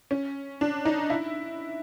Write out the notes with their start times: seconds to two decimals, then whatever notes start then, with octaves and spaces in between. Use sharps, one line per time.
0.11 C#4
0.61 D4
0.85 D#4
1.10 E4